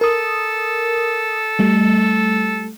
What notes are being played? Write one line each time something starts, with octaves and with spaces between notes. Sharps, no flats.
A4 A#4 D#6
G3 A3